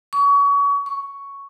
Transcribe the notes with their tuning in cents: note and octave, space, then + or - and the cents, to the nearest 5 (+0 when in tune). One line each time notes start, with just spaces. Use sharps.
C#6 +30
C#6 +5